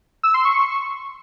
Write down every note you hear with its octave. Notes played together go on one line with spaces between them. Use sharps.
E6
C6
C#6